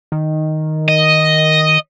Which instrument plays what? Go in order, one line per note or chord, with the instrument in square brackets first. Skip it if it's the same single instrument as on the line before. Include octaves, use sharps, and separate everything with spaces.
[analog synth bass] D#3
[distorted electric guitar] D#5